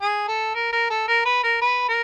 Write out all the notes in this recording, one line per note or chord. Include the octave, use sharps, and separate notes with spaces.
G#4
A4
A#4
A#4
A4
A#4
B4
A#4
B4
A#4